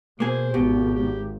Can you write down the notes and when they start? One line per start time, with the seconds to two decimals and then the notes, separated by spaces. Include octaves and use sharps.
0.20 B2 A#3 G#4 C5
0.54 G#1 B2 G4
0.94 G4